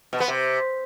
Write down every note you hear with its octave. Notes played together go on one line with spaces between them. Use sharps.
B2
B3
C3